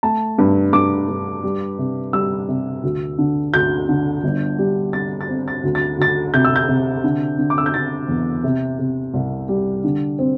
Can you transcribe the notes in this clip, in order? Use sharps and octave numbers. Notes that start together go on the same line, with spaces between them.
A3 A5
G2
G2 D6
G2
G3
C3
G3 E6
C3
D2
D3
D2 G6
D3
G1
G3
G3 A6
A6
C4
A6
D2
A6
D2 A6
C3 G6
E6
G6
C3
D3
D3
D6
E6
G6
D3 A6
E2
C3
C3
C2
G3
D3
C4